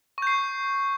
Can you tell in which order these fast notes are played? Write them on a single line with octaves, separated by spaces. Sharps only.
C#6 G6 C7